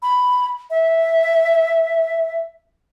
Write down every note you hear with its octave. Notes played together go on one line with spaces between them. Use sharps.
B5
E5